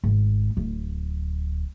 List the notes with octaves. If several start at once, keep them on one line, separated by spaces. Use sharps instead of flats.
G#1
D1